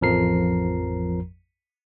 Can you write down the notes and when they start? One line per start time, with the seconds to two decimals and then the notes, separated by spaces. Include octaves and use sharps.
0.01 A1 F2 F3 A#4 A#5 C7